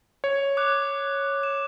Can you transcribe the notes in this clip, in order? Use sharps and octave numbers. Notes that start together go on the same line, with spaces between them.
C#5
D6 F#6
E7